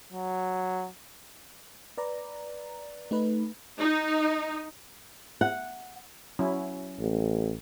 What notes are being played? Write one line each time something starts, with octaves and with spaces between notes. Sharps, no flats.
F#3
B4 D5 A#5
A3 D#4 B4
D#4
F#5
F#3 C#4 E4
A1